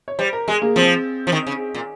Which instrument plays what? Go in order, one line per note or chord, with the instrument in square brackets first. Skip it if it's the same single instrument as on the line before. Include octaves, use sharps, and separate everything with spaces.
[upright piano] C#5
[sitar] G3 [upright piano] C5
[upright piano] A#4
[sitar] G#3 [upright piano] G#4
[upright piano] A#3
[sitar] F3 [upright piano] C4
[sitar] F3
D#3
C#3
A#2